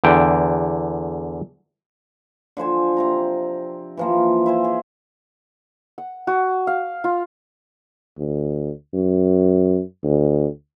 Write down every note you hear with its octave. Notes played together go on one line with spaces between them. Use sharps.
E2 D3 G5
D3 F3 C5 G#5
C3 C4 A#5
E3 F3 A#3
E4 C5 G#5
G#4
F#5
F#4
F5
F4
D2
F#2
D2